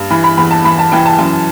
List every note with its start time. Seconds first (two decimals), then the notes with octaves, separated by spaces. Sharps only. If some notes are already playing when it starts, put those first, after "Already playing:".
Already playing: G2
0.10 E3 B5
0.24 B5
0.37 E2 B5
0.51 A5
0.64 E3 B5
0.79 A5
0.92 E3 G5
1.06 A5
1.19 F#2